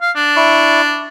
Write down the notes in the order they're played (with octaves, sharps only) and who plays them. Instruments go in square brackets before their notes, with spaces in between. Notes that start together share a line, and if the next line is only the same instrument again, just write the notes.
[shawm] F5
D4
[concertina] E4 D5 C#6